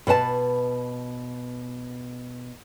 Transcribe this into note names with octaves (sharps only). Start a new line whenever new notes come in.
B2 B4 D#5 A5